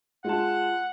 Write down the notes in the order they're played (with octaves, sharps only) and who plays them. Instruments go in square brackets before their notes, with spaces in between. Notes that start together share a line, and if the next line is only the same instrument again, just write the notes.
[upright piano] G#3 F4 A5 [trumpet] F#5